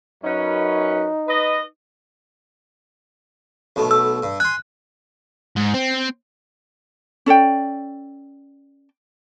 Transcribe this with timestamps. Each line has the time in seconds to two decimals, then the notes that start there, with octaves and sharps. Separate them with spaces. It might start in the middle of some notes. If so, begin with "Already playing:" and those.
0.24 F#2 C#4 D#4 B4
1.28 B4 D#5
3.76 B1 B2 A3
3.91 E6
4.23 G2
4.40 G#5 C6 F#6
5.57 G#2
5.74 C4
7.26 C#4 A4 D5 G5